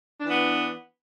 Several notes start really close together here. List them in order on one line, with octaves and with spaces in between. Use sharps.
D4 E3 B3